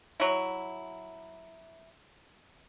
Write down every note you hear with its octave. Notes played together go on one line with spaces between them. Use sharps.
F#3 E4